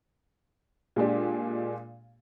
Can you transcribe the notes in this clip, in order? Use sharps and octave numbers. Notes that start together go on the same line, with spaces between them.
A#2 G#3 D4 G4